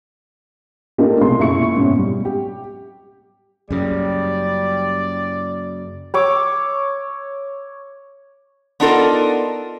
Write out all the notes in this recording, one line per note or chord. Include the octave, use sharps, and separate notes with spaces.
A3 A#3 D4 D#4 F4 G4
B1 C3 G#3 C6
F#1 A#2 E4 C#6 C#7
G#2 B2 C#4
G3
G4
F#2 C#3 G3 D5
C#5 D6 E6
B3 D4 D#4 F4 A4 A#4